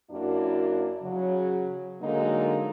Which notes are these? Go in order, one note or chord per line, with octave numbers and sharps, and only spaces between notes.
F#2 A#3 D4 E4 F#4
C#3 F#3
D3 F#3 G#3 A#3 D#4